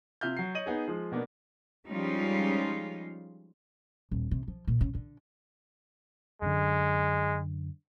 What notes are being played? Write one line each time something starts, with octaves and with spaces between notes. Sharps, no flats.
C3 F4 E5 F6 G6
F#3 C7
C#5 D#5 D#7 F#7
B3 D#4 G#4
F3 G#3
B2 A#3 B3 D4
F3 G3 G#3 C#4 D#4 F4
D#1
C3
F3
A#2
C#3
D3
F#2 D3 G#3